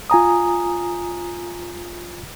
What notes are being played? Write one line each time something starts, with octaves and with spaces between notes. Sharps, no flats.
F4 G#5 A#5 D#6